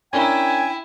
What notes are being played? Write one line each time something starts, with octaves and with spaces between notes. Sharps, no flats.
C#4 D4 E4 A#4 G5 G#5